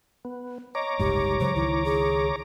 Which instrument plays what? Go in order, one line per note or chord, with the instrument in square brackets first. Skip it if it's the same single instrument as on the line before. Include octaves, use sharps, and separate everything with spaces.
[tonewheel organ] B3
[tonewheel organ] C#5 A#5 D6 [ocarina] D#5
[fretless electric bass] F#1 C2 G#2 [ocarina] G4
[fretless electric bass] C#3 F#3 G#3 [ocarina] C5
[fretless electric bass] C#2 D#3 [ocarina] E4
[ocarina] G#4